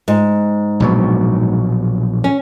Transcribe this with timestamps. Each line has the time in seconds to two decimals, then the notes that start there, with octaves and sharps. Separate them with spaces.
0.08 G#2
0.80 A#1 B2 F#3
2.24 C#4